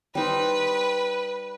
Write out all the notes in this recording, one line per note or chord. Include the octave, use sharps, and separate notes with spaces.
G3 D#4 B4 C5